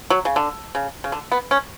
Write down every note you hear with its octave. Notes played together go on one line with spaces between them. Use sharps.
F#3
C#3
D3
C#3
C#3
D3
B3
C#4